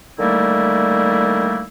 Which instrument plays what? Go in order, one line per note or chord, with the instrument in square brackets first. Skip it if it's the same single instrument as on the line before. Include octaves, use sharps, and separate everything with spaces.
[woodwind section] D3 D#3 G3 A3 A#3 E4